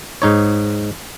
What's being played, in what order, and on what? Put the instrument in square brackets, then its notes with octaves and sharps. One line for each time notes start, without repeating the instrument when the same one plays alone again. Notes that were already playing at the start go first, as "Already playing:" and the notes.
[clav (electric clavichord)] G#2 D#4 C#5